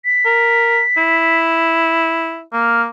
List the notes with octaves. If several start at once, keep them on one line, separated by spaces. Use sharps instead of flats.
B6
A#4
E4
A#3 F6